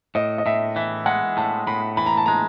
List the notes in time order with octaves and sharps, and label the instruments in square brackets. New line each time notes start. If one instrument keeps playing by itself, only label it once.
[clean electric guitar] A2 [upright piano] D#5
[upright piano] D#5
[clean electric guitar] A2 [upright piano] E5
[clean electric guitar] E3 [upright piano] E5
[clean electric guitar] G#3 [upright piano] F#5
[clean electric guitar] A2 [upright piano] A5
[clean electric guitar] A2 [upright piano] B5
[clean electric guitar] E3 [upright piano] B5
[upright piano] A#5
A5
[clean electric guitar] G#3 [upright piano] A#5